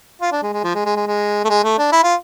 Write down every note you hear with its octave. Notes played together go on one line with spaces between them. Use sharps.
F4
D4
G#3
G#3
F3
G#3
G#3
G#3
G#3
A3
G#3
A3
D4
E4
F4